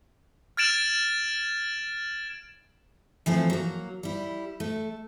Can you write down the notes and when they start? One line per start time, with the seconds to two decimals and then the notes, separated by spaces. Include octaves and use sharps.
0.57 F6 G#6 A6 D7 E7 F#7
3.26 E3 F3 A3 C4
3.50 F#3 A#3
4.03 G3 E4
4.60 A3